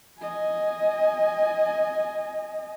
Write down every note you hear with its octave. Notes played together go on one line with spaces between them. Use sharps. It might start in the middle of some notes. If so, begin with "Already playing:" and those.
D#5 G#5